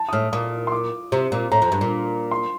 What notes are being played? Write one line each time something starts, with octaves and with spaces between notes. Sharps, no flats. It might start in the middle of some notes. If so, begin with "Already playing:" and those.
Already playing: A5
D#6
A2 F6
A#2 D#6
C6
D6
C3
A#2
A2 A#5
F2
G2
A#2
C6